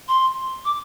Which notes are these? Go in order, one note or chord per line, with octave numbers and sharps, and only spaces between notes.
C6
D6